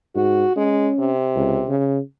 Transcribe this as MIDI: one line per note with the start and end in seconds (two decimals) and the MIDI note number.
0.16 0.45 44
0.16 0.52 66
0.56 0.90 56
0.56 1.11 61
0.99 1.73 48
1.36 1.62 37
1.69 1.99 49